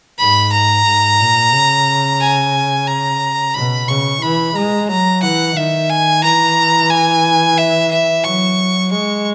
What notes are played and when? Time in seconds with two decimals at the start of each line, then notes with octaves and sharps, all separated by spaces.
0.19 G#2 B5
0.52 A#5
0.86 G#2
1.20 A#2
1.53 C#3
2.21 G#5
2.87 A#5
3.54 B2 B5
3.88 C#3 C#6
4.22 E3 B5
4.55 G#3 A#5
4.88 F#3 A#5
5.22 E3 F#5
5.56 D#3 E5
5.89 G#5
6.23 E3 A#5
6.90 G#5
7.57 E5
7.91 E5
8.24 F#3 C#6
8.91 G#3 C#6